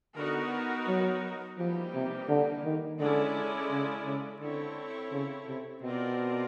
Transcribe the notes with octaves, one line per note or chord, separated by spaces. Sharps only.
D3 B3 D#4 F#4 A#4
F#3
E3 F3 G3 A#3 D#4 G4
C3
D3
D#3
D3 G#3 C#4 E4 A4 D5
C#3
C#3
D3 C4 E4 A4 C#5
C#3
C3
B2 C4 F4 A#4 D5